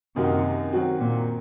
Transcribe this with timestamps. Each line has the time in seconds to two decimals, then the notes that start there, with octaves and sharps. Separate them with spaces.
0.16 F#2 C3 D#3 A#3 D#4 F#4
0.73 D#3 F#3 C4 F#4
1.00 A#2